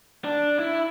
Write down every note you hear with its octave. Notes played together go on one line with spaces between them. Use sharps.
D4
E4